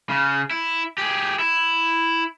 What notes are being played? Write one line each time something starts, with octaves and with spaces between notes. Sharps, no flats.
C#3
E4
G4 G#4
E4